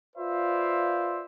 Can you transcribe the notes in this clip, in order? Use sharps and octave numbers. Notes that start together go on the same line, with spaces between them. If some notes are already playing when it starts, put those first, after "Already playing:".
F4 B4 C5 D5 E5 F5